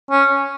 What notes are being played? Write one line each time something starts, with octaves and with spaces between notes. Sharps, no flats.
C#4